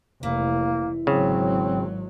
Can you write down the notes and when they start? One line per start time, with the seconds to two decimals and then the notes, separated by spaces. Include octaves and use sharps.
0.23 F1 E3 A#3
1.07 G#1 C#3 F#3 C4